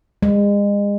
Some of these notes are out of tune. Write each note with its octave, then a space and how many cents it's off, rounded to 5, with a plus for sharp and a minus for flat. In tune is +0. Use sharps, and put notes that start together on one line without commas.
G#3 -35